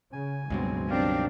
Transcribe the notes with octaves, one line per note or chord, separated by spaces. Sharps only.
C#3 G#5
C#2 G2 B2 F#3 G#3 C4
D#3 F#3 C4 D4 G4 F5